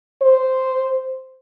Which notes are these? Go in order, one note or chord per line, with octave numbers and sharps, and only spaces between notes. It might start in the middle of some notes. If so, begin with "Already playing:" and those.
C5